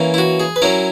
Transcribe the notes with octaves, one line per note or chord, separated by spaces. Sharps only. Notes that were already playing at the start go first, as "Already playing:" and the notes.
Already playing: E3 A#3 C#4
E4
F#4
G#4
B4
F#3 C#4 E4 A#4